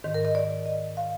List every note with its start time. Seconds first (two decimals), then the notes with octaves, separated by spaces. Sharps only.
0.04 G#2 D#3
0.14 A#4
0.25 D#5
0.35 D5
0.66 D#5
0.97 F5